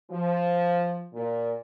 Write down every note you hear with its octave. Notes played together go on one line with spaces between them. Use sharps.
F3
A#2